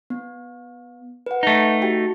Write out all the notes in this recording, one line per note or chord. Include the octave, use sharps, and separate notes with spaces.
B3
B4 F#5
A3 D#4
F#4 G4 G5